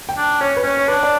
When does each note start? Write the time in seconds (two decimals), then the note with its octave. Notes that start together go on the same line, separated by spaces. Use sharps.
0.09 G5
0.17 D4
0.41 C#4 C#5
0.57 B4
0.63 C#4 C#5
0.77 C#5
0.88 D4 B4
1.03 D5